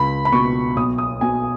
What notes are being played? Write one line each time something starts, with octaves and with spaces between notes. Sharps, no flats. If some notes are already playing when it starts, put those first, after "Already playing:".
Already playing: C#2 B5
B5
B2 C#6
B1 D#6
D#6
B2 G#5